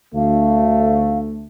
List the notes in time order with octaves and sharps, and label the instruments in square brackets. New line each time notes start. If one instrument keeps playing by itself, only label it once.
[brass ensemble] D2 A3 [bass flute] F5